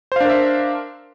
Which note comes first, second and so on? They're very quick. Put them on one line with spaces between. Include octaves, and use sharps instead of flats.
C5 F5 D4 A#4 E5